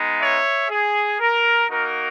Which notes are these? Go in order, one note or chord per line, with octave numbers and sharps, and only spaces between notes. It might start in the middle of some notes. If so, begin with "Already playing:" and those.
Already playing: G#3 B3 D#4
C#5 E5
G#4
A#4
A#3 D#4 F#4 A#4